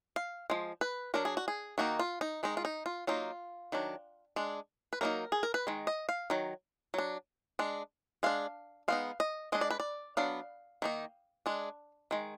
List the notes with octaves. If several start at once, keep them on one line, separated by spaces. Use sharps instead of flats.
F5
F3 G#3
B4
F#3 D4 A#4
G#4
F#4
G#4
D#3 A#3 D#4 F#4
F4
D#4
D#3 G#3 D#4
F4
D#4
F4
F#3 A#3 D#4 F4
D#3 F#3 D4
G#3 D4
B4
F#3 A#3 D#4 A#4
G#4
A#4
B4
D#3 G#3
D#5
F5
D#3 F#3
F#3 D4
G#3 D4
G#3 D4 F5
G#3 B3 D#4 F5
D#5
G#3 D4 D#5
D5
B4
D5
F#3 B3 D4 F5
D#3 A#3 D#4
G#3 D4
D#3 G#3